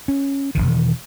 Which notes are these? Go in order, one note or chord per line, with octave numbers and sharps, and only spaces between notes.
C#4
E1 B1 D#3